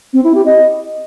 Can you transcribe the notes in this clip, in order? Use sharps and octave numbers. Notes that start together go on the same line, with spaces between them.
C4
E4
G4
D#5